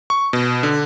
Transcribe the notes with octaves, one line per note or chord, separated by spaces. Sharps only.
C#6
B2
D3